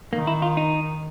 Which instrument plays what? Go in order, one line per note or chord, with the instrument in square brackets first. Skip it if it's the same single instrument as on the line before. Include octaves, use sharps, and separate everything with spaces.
[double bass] D#3 [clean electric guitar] A#3
[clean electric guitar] E4
F4
D#4